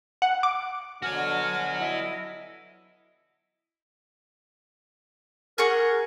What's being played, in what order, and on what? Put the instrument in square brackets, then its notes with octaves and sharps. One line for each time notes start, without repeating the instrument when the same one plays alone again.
[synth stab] F#5
D6
[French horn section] B2 D3 [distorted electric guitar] F#4 C#5 [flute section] G#5 F6
[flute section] E4 D#5
[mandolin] G#4 F#5 C#6 [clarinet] A#4